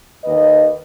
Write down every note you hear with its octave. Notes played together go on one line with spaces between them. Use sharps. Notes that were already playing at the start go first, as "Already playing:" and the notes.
D#2 B4 D#5